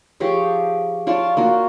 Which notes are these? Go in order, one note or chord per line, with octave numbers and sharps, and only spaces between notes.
F3 G4 G#4 C#5
F4 C#5 D5 A5
A#3 F4 F#4